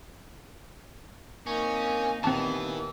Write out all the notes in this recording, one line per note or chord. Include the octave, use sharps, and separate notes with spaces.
A#3 C4 C#4 D#4
D#2 A#2 D#3 E3 B3 C4 A5